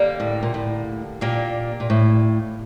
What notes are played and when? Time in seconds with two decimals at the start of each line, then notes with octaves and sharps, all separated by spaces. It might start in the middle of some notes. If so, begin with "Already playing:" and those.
Already playing: D3 G3 A#3
0.20 A2
0.43 A#2
0.54 A2
1.21 A#2 A#3 D4 G4
1.80 A#2
1.90 A2